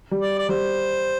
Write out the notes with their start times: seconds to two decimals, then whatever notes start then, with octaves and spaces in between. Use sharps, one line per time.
0.11 G3
0.21 D5
0.38 D5
0.49 G3 C5